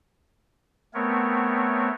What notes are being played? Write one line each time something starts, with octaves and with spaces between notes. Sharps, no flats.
A3 B3 C4 A#4 C#5